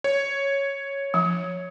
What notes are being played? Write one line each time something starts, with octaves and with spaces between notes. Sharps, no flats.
C#5
F3